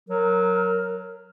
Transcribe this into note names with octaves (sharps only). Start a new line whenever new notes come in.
F#3 A#4